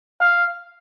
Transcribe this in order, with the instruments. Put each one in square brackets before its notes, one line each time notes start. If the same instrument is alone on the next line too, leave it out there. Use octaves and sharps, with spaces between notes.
[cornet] F5